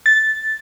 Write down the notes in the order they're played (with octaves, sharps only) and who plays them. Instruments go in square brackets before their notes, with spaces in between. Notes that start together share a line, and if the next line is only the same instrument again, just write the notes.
[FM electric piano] A6